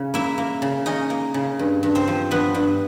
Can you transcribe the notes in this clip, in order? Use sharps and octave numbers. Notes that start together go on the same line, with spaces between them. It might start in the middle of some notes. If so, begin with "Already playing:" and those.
Already playing: C#3 C#4
A#3 E4 E5
A#3
C#3
C#4 D#4 D#5
A#3
C#3
G2
G2
C4 C5
F3
G2 B3 B4
G2